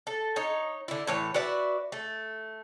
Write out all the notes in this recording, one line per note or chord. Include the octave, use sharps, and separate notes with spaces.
A4
D#4 C#5
D3 E4
A2 E3 C#5
F#4 B4 D5 E5
A3